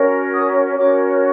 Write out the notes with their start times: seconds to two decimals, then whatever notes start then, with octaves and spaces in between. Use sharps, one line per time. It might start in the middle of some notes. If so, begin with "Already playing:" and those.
Already playing: C#4 F#4 A#4 C#5
0.34 D#6
0.77 C#4 F#4 A#4 C#5 D6